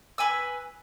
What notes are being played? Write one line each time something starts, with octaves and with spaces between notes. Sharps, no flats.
B4 G#5 E6